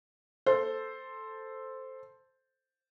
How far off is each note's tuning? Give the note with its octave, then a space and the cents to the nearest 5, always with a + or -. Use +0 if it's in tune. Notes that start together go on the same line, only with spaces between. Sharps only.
A4 +0 C5 +0